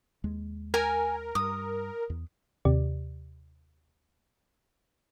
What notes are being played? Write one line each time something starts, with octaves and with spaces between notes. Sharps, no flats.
D#2 G#3
A#4 G#5
G2 D#6
E2
D#2 C3 G4 D5